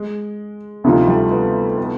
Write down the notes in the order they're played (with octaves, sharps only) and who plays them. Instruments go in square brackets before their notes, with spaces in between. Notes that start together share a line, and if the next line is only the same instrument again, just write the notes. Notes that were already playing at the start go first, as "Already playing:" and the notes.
Already playing: [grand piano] G#3
[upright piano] D2 C3 F3 A#3 D#4
[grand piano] G3 A3
A3 B3
A3 B3